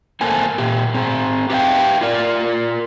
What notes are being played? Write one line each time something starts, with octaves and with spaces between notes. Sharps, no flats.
A#3 C4 A4 G#5
A#2 G4
C4 G#4
G4 B4 E5 F5 G5
F4 A#4 D5